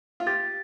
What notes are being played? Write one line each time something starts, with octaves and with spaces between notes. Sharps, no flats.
F4
G4 A6